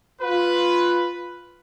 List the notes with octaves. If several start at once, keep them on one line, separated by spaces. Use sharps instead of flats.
F4 B4